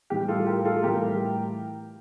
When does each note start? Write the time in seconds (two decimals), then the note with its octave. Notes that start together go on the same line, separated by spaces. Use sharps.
0.10 A2 E3 G3 G4
0.28 F4 A4
0.47 G4 A#4
0.65 F4 A4
0.83 A2 E3 G3 G4 A#4